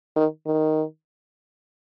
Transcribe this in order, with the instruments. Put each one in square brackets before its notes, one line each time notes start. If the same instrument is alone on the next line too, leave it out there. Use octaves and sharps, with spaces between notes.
[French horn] D#3
D#3